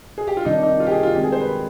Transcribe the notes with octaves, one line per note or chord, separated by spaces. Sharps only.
G#4
G4
F4
C3 D#3 G3 D4 D#4
D#4
F4
G4
G#4
F4
D#3 G#3 C4 G4
G#4
C5
B4